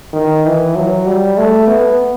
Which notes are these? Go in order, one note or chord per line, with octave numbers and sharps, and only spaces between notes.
D#3
E3
F#3
G3
A3
B3